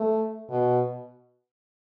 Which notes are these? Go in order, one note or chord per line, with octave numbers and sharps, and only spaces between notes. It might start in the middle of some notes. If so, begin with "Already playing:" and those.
Already playing: A3
B2